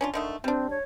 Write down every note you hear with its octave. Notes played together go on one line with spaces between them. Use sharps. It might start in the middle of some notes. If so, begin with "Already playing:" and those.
C#4 D4 F4
D3 D#3 A3
G3 C4 D4
C#5